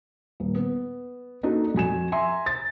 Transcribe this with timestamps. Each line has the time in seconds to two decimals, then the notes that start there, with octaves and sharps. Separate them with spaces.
0.40 D#1
0.55 B3
1.43 A#3 D4 D#4 F#4 A4
1.74 F2 F#4 G#5 E7
2.12 E5 G#5 A#5 C6
2.46 A6